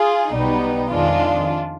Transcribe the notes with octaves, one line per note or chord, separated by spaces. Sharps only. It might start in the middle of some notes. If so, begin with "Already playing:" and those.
Already playing: F4 G#4
B1 B2 G3 B3 D#4
F2 D#3 G#3 D4 F4